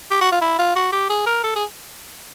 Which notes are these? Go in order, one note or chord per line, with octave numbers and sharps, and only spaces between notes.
G4
F#4
F4
E4
F4
F#4
G4
G#4
A#4
A4
G#4